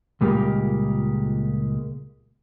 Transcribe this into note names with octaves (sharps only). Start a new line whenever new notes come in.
C#2 A#2 G3 G#3 G4 A#4